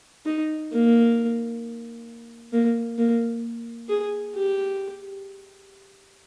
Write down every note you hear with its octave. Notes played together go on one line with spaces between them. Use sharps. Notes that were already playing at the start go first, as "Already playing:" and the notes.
D#4
A#3
A#3
A#3
G#4
G4